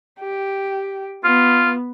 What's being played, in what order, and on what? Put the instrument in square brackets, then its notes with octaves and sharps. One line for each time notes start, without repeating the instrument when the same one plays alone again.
[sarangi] G4
[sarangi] B3 [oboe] F4